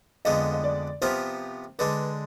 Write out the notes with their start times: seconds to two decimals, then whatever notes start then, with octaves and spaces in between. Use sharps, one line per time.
0.25 F2 D3 G#3 B3 D#5
0.53 D#5
0.63 D5
1.01 C3 F3 B3 F4 C5
1.79 D3 G#3 D4 B4